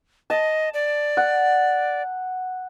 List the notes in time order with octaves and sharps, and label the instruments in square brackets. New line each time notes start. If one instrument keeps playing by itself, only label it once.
[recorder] D#5 [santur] A5
[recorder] D5
[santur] F#5